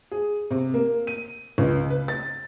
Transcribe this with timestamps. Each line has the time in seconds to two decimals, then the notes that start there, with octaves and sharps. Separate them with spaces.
0.11 G#4
0.51 C3
0.74 A#3
1.07 D#7
1.58 C#2
1.90 B4
2.08 A6